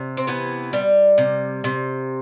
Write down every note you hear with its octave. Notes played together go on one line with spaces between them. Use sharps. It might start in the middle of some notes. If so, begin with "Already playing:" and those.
Already playing: C3
C4
E3 B3
G3
C3
C3